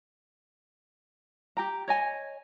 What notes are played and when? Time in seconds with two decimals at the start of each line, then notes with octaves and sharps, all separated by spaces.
1.57 G4 G5 A#5
1.88 C#5 D#5 G#5